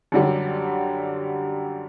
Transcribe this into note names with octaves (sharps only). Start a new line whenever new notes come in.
F#2 D3 G3